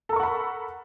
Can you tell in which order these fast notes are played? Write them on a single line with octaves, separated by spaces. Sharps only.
A4 A#4 C#6 F#5 B5